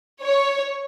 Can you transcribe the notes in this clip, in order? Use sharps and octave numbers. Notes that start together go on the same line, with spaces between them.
C#5